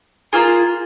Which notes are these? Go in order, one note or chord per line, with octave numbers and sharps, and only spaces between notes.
A#3 F4 G#4